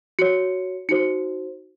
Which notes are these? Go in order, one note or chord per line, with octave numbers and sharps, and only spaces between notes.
F#4 C#5 C#7
D#4 F#4 C5 C#7